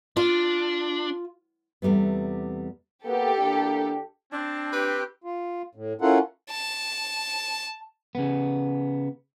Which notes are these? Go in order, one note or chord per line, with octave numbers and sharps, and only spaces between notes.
D4 F4
E2 C3 G3 A3 B3
A#3 B3 G4 A4
E2 A#3 D4
C4 D4 A5
G4 B4
F4
A2
C#4 E4 F4 A4 A#4 F#5
A5
C#3 B3